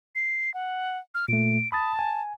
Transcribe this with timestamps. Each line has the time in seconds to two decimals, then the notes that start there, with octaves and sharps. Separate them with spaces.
0.15 C7
0.54 F#5
1.15 F6
1.28 A#2 A3 D7
1.72 A5 B5 D#6 A6
1.99 G#5